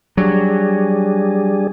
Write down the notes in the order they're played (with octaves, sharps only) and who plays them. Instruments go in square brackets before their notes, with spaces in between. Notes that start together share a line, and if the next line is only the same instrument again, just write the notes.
[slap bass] F#3 [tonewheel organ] G3 D4 G#4